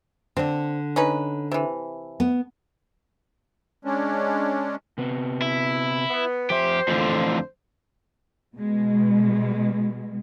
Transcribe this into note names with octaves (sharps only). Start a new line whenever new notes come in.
D3 C4 D4
C#4 D#4 B4
C3 E3
B3
G#3 C#4 D4
C3 B3
E4
B3
F2 G4 C5 E5
F2 D3 E3 A3 F4
B2 G#3